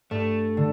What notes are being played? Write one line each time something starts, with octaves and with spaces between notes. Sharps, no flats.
G2 A3
D3